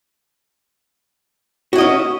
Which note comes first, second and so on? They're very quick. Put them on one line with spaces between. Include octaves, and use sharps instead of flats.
F#4 E4 D#5 C#4